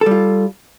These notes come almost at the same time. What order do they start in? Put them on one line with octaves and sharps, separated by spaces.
A4 G3 F4